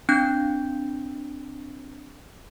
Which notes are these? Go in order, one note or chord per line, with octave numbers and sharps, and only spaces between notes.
C4 D4 G6